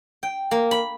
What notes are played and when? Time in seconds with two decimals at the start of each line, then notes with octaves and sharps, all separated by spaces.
0.23 G5
0.51 A#3
0.71 B5